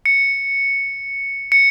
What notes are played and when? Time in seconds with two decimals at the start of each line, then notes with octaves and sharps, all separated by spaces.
0.06 C#7
1.52 C#7